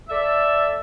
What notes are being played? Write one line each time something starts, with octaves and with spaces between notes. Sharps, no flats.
A4 D5 E5